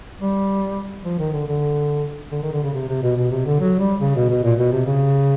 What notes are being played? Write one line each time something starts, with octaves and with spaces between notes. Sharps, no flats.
G3
F3
D#3
D3
D3
D3
D#3
D3
C#3
C3
C3
B2
B2
C3
D3
F#3
G3
C#3
B2
B2
A#2
B2
C3
C#3